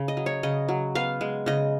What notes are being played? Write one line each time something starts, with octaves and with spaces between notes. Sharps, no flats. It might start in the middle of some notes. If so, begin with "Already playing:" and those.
Already playing: C#3
D#5
F#3
C#5
C#3 D#5
F#3
B3 F5
G#3
C#3 D#5